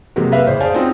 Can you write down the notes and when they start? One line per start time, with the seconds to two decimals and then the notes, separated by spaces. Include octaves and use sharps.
0.16 C3 F#3 G#3 A#3 F#4 G4
0.32 A#3 B4 E5 F5
0.47 A1 C#3 C5
0.60 G#4 C5 D5 F5 G#5 A5
0.74 C4 C#4 D#4 F4 F#4 G#4